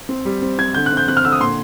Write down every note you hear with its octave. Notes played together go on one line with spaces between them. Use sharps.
C4
G3
C4
C4 G#6
D3 G6
F#6
C4
G6
C4 F#6
F6
D3 E6
D#6
A#2 C6